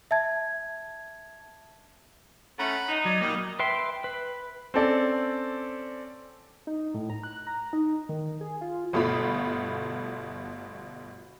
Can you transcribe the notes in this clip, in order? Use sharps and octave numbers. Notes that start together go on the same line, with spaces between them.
E5 A5 G#6
A3 C#4 F#5 A#5 B5
D#4
F#3 D5
G3 A#3 D#4 D5 D#5
B4 E5 G5 C6
B4
C4 C#4 A4 D5
D#4
A2
A#5
F#6
A#5
D#4
D#3
G#4
F4
G1 B2 A3 F4 B5